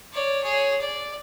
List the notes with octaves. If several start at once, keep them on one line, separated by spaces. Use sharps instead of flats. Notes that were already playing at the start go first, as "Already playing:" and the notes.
C#5 D5
G#4 C#5
D5